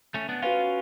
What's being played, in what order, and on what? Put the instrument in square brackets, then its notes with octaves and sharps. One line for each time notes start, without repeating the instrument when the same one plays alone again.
[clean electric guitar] A3 C#4
B3 D4
[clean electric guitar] C#4 F4 [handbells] F#4 B4 F5